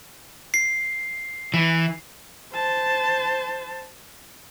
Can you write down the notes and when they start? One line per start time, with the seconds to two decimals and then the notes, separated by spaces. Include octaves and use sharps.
0.54 C7
1.54 E3
2.53 C5 A5